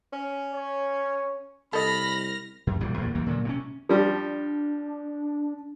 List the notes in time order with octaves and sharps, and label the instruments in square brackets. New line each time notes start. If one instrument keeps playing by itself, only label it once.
[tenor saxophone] C#4
[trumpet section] C#5
[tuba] C2 [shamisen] A4 D#5 [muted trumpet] B5 [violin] F6 A#6
[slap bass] F#2
E1 A#1 E3 G3
E2 G2 A#2
D#2 E3 F#3 A#3
A#2 D3 F#3
C3 A3 C#4
[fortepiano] F3 G3 [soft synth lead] D4